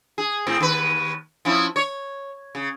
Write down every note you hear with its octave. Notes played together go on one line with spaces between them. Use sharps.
G#4
A2 C4
D#2 B4
F3 C#4 E4
C#5
C#3